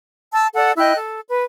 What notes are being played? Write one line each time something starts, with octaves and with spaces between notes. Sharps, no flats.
A5 E6
A4 D5 F#5
E4 D#5 G5 F#6
A4
B4